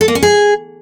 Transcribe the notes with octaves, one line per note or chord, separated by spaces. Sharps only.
A4
A#3
C#4
G#4